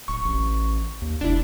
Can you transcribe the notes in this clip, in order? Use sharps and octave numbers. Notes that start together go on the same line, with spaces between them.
D1 C#6
A1
D#2
F1 D4 E4